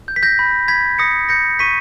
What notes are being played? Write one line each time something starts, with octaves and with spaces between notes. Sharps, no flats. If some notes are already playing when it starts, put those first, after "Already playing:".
G6
B6
G6 A#6
B5
B5 G#6 B6
D#6 A#6 C#7
G6 A#6 C#7
C#6 B6 D#7